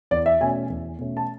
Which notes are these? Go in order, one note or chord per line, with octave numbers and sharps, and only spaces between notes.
E2 D5
E5
B2 A3 C#4 G#5
E2
B2 A3 C#4
A5